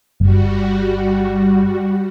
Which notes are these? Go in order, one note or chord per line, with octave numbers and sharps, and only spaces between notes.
G1 G3 F#4